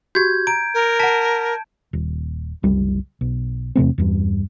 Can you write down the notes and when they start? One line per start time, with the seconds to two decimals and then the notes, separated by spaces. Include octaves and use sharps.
0.15 F#4 G4 G6 G#6
0.47 A#5 D7
0.74 A#4
1.00 F#5 A5 B6
1.93 D#1
2.63 F#1 C2 G3
3.21 B1
3.76 E2 C3 A3 C4
3.98 E2 G2